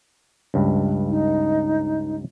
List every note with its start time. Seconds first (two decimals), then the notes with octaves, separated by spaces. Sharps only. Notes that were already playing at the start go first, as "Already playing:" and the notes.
0.54 C#2 G2
1.09 D#4